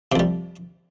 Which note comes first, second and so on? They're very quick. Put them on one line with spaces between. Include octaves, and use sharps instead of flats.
C3 F2 G3